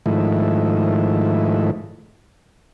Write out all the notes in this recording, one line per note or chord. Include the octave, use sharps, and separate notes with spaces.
G#2 D#3 F3 A3 E4